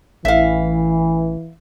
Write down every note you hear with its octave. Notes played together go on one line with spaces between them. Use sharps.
A1 E3 E5 F5